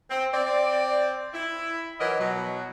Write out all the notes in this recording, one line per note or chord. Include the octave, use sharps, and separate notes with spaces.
C4
C4 D5
E4
E3 F#3 A#4 B4 D#5
B2 F#3